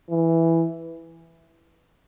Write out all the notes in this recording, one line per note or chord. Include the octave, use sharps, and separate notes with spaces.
E3